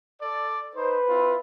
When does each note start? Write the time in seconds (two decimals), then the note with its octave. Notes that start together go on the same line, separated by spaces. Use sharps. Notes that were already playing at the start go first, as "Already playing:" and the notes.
0.21 A4 D5
0.75 D#4 B4 C5
1.08 C4 E4 F4